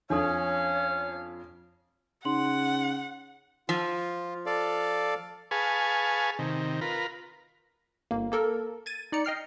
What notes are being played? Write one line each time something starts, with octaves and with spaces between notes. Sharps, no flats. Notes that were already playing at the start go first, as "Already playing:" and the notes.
F2 C#4 D4 A4 C#5 F5
C#3 D#4 F#5 C6 F#7
F3 F4
A4 D5 F5
G#4 B4 F5 G#5 A5 C#6
C3 D#3
F4 A#4 B4
G1 A#3
A#3 A4 A#4
G#6 A6 D#7
D#4 D5 A#5 C#7
D#5 G5 F6 C7